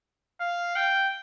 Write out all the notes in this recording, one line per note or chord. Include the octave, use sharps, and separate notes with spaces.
F5
G5